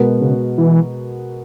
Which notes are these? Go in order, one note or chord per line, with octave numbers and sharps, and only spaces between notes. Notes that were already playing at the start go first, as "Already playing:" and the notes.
Already playing: B2 G#3 B3 F#4 A#4
C#3
E3